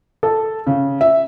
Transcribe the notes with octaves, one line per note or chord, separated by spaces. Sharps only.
A4
C#3
E5